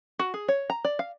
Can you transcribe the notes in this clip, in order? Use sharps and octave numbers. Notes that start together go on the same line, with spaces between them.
F#4
G#4
C#5
A#5
D5
F5